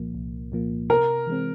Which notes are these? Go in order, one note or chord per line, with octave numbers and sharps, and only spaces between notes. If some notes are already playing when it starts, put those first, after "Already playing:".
Already playing: C2 A#2 F3 A#3
C2
A#2 F3 A#3
C3 A#4
E3 G#3 C4